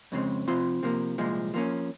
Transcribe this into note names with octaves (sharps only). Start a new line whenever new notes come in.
F2 C#3 G#3 C4
C3 F3 C4 F4 C5
C3 F3 A#3
C2 A#2 F3 G#3
F3 A#3 C#4